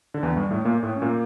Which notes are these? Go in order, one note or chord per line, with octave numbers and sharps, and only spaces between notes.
D3
E2 E3
G2 G3
A2 A3
A#2 A#3
A2 A3
C#4
A#2 A#3